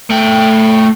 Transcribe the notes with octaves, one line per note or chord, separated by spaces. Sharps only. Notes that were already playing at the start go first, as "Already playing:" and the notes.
A3 G5